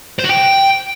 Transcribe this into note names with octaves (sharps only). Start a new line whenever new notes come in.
C5
F#4
G5